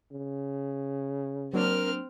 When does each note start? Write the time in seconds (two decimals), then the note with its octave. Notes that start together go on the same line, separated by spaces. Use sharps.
0.12 C#3
1.53 F#3 A#3 C4 D4 A#4 F6